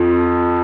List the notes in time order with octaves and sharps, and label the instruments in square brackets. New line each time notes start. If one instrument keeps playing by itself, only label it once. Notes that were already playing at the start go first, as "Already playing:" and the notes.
Already playing: [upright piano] F2 F3